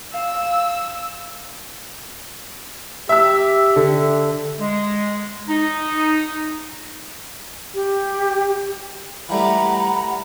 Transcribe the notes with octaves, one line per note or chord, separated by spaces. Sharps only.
F5 E6
G4 E5 E6
D3
G#3
D#4
G4
E3 G3 A3 F#5 A#5 B5